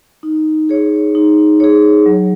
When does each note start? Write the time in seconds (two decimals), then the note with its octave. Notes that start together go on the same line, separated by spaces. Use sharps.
0.23 D#4
0.69 G#4 C#5
1.15 D#4
1.60 G#4 C#5
2.06 F#3